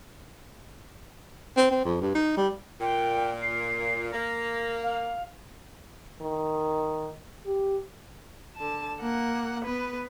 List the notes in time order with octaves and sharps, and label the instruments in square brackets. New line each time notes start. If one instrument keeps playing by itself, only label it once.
[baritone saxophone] C4
C4
F2
G2
D#4
G3
[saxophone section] A#2 [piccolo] G5
[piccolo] C7
[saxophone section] A#3 [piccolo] A#6
[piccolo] F5
[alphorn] D#3
G4
[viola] D3 A5
A#3 F#5
B3 B4